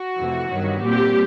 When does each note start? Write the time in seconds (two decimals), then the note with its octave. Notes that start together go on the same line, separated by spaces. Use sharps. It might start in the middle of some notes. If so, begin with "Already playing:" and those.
Already playing: F#4
0.18 F2 C3 E3 A3
0.50 G2 D#3 F#3 B3
0.83 A#2 G3 C4 G4